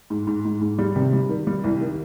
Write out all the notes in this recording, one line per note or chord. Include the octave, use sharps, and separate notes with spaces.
G#2
G#2
G#2
G#2
G3
C3
G3
D#3
G3
C2
D#3